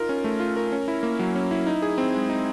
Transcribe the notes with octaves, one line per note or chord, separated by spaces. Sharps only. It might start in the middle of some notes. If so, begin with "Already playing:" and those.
Already playing: D#4 F4 A#4
C#4
A3
F4
A#4
C#4
E4
A#3
F#3
C#4
E4
D#4
G#4
C4
G#3
D#4